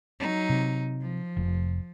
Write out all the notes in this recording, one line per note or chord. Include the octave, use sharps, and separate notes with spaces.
F#3 D#4
C3
F3
F1 F2